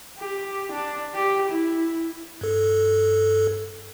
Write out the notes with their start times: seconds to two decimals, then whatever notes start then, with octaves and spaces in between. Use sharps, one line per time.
0.18 G4
0.71 D4
1.15 G4
1.49 E4
2.41 G2 A4